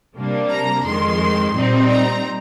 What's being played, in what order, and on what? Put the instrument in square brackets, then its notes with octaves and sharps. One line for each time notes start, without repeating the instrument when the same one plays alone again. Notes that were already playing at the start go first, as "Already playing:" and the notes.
[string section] C3 G3 A#3 D4
A#5
F2 D#3 G#3 C6
A#2 G3 C4 D#4
A#5